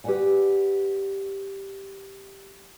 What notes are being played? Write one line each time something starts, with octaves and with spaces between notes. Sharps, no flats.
G4 B4 C5 D5 F#5 G#5